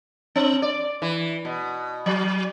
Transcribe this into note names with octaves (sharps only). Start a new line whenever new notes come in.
C4
D5
E3
B2
F#3